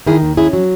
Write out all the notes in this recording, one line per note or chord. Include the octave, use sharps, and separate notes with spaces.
D#3 E4 G#4
D#2
C#4 E4 G#4
F#3